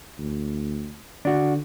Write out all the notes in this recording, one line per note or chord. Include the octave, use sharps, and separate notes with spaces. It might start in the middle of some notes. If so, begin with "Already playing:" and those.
D2
D3 D4 F#4